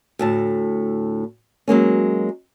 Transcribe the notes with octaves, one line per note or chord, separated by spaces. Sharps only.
D2 A2 A5
F#3 G#3 A#3 C#4